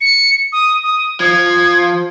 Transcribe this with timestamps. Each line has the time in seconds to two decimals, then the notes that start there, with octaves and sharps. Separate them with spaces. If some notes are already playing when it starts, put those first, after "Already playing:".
0.01 C#7
0.52 D#6
0.84 D#6
1.20 F3 G#6